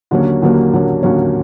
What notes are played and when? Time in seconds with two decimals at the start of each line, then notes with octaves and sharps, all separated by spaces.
0.11 D#2 D3 F#3 A#3 C#4
0.42 D#2 D3 F#3 A#3 C#4
0.73 D#2 D3 F#3 A#3 C#4
1.03 D#2 D3 F#3 A#3 C#4